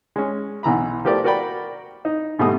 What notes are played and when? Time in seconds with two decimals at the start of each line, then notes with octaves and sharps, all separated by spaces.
0.16 G#3 C#4
0.63 B1 B2 E3 A#5 B5
1.05 F3 A3 G4 A#4 D5
1.24 F#4 A#4 D5 G5 B5
2.05 D#4
2.39 G#1 B2 G3 A3 D#6